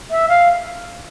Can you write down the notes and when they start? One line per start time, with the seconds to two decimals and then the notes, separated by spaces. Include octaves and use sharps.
0.11 E5
0.29 F5